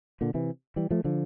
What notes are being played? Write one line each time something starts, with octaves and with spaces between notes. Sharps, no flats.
A#2 D3
C3 E3
E3 G3
F3 A3
D3 F3